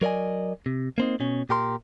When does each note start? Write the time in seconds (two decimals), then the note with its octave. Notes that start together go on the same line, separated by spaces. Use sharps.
0.02 F#3 A#4 D5 D#5 G#5
0.66 C3
0.98 A#3 C4 D#4
1.20 B2 C#4
1.49 A#2 G4 A#4 C6